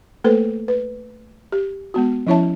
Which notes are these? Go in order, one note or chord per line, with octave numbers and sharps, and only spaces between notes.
A3 A#3 A4 B4 C5
B4
G4
G#3 B3 F#4
F3 C#4 E4 C#5 E5 A5